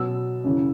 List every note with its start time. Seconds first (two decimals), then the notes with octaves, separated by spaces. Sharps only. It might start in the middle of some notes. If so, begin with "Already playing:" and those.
Already playing: B2 F#3 E6
0.44 F#2 C#3 E3